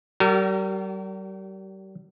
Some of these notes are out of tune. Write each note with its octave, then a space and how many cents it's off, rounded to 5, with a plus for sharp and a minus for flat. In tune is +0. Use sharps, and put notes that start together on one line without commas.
G3 -35 F#4 +40 A#4 -25